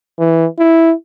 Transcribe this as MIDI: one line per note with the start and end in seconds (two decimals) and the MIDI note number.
0.19 0.47 52
0.59 0.94 64